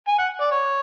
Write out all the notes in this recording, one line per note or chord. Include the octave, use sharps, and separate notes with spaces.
G#5
F#5
D5
C#5